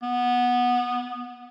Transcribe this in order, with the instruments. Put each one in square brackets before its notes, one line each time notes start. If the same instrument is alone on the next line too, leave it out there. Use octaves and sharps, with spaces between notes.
[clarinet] B3